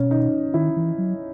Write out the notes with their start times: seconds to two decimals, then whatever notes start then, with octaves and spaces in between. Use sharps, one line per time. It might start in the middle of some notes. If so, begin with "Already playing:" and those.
Already playing: B2 C#4
0.11 D#4
0.54 D#3 E4
0.77 E3
0.98 F#3